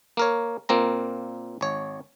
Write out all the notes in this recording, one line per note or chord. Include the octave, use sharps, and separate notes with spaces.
A#3 A#4 C#5
A#2 A#3 C4 A#5
G#1 C#5